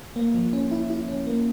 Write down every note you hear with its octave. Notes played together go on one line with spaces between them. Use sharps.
A#3
F3
C#4
E4
E4
C#4
A#3